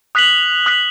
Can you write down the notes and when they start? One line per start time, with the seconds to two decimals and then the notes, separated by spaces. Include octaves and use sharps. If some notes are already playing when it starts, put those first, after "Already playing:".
0.15 D#6 F#6 B6 F#7
0.66 D#6 F#6 B6 F#7